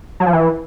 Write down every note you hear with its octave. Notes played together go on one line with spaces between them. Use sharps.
F#3
F3
E3